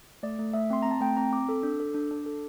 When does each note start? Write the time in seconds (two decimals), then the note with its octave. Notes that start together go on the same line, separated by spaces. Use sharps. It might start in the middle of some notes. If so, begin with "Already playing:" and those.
0.23 A3 D5
0.39 A3
0.53 A3 E5
0.70 C4 C6
0.82 C4 A#5
0.91 A5
1.01 A3 G5
1.17 C4 A#5
1.33 C4 D6
1.49 A4
1.63 D4
1.80 A4
1.94 D4
2.11 D4
2.26 A4